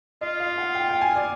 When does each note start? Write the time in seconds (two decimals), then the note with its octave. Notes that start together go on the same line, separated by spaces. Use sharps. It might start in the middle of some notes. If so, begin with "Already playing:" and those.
0.21 F4 D#5
0.40 F5
0.58 F#5
0.75 G5
0.89 G5
1.01 G#5
1.16 D5